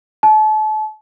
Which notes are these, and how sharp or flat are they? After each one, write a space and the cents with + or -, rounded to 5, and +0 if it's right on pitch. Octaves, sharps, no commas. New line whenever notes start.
A5 -35